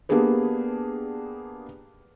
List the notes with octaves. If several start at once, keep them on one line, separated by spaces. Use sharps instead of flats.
A#3 B3 D4 G4 G#4 B4